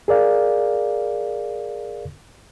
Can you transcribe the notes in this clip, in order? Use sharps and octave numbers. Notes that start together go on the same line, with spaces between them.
G#4 A#4 D5 F5